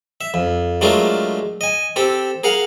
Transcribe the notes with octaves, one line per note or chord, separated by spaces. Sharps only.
E5
F2
F#3 G#3 A3 D4 F4 A#4
D#5 G#5
C4 G4 A4
G#4 A#4 F5 F#5